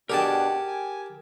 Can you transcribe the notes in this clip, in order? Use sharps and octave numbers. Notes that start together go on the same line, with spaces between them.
B2 D4 G4 G#4 A#4 F#5 G5 A5
G#5